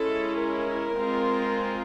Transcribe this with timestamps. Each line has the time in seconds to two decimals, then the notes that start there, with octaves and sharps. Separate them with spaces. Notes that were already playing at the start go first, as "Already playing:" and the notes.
Already playing: G#3 C#4 E4 A4
0.39 A#4
0.93 G#3 C4 F4